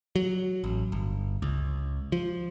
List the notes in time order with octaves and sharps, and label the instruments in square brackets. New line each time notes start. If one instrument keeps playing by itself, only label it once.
[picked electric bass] F#3
A1
G1
C#2
F3